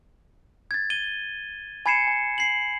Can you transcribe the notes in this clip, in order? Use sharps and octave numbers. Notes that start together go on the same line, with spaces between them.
G#6 A6
D#7 G7
G#5 B5 G#6 C7 C#7 E7
G#5
C7 F#7